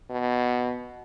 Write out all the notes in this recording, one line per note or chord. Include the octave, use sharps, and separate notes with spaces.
B2